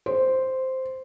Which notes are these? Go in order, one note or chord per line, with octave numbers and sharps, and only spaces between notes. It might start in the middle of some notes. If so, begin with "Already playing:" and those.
C5